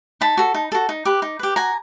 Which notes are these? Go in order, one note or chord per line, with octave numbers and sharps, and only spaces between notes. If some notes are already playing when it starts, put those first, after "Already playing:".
D#4 A5 B5
F#4 A4
D#4
F#4 A4
D#4
G4 B4
D#4
G4 B4
F#4 G#5 A#5